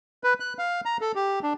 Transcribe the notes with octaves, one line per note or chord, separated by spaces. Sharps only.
B4
F#6
F5
A#5
A4
G4
D4